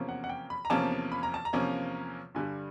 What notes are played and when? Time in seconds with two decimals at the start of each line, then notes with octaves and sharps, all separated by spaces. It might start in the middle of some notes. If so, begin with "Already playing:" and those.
Already playing: E2 C3 F3 A#3 C#4
0.09 F#5
0.24 F#5
0.29 G5
0.50 B5
0.65 A#5
0.70 E2 C3 F3 A#3 C#4 A5
1.12 B5
1.23 A#5
1.34 A5
1.45 A#5
1.53 E2 C3 F3 A#3 C#4
2.35 G2 D3 G3 G#5